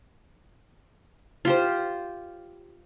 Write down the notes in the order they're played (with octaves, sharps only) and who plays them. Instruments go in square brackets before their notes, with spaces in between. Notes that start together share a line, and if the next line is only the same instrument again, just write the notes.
[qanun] F4 G4 C5